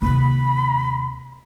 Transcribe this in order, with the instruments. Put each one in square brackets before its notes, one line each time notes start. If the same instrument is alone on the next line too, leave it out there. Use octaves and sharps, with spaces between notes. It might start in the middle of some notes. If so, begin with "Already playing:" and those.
[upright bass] D#2 C3 [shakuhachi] B5